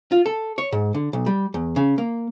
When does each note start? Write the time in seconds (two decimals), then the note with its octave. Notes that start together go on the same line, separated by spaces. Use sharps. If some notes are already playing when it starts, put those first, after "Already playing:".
0.12 F4
0.26 A4
0.58 C#5
0.72 G#2
0.94 D3
1.13 B1
1.26 G3
1.54 E2
1.76 C#3
1.98 A#3